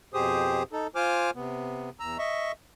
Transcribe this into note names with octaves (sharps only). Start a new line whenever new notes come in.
F2 B2 G4 G#4 C5 D#6
D#4 A4
F4 C5 G#5 D6 F6
C3 B3
E2 A#5 E6
D#5 E5 C#6